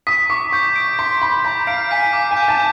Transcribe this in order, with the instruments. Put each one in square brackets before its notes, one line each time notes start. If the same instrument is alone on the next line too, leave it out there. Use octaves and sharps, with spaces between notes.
[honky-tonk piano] D#6 [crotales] B6
[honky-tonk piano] C#6 [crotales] D6
[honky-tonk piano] C#6 [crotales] G6
[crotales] D7
[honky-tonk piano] C6 [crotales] B6
[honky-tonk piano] B5 [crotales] D6
[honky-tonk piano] A#5 [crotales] G6
[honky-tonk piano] F5 [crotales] D7
[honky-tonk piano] G#5 [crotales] B6
[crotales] D6
[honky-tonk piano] G#5
[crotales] G6
[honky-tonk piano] A5